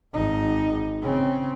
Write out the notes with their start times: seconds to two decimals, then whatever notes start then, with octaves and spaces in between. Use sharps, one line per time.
0.14 G#1 D#4
1.02 C#3 C4